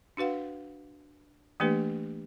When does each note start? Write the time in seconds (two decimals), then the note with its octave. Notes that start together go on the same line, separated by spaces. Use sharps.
0.17 D4 F#4 B4 F5 F#5
1.60 E3 A3 A#3 D4 G4 B4